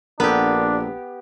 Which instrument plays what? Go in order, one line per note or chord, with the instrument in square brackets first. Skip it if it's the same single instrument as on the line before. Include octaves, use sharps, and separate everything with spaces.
[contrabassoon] A#1 [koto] B3 G4 [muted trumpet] D4 [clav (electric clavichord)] A4 A#4